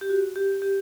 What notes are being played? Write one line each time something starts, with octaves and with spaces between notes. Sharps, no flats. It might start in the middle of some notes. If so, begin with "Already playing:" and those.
G4
F#4
G4
G4